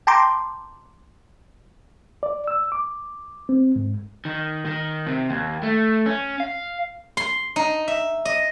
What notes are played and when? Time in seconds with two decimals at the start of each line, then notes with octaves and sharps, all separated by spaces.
0.07 G5 A5 A#5 C6 D6 G6
2.23 D5
2.47 E6
2.72 D6
3.49 C4
3.76 G#2
4.25 D#3
4.66 D#3
5.07 C3
5.30 D#2
5.63 A3
6.06 C#4
6.40 F5
7.17 C6
7.56 D#4
7.88 E5
8.25 D#5